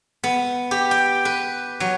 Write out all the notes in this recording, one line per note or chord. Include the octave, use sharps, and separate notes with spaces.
B3
G4
G5
B4
F#3